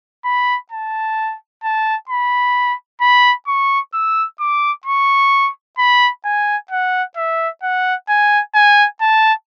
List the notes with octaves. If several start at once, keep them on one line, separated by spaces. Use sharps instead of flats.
B5
A5
A5
B5
B5
C#6
E6
D6
C#6
B5
G#5
F#5
E5
F#5
G#5
G#5
A5